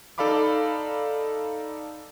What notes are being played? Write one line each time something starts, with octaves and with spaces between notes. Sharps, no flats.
D#4 A4 D5 F5 B5 D6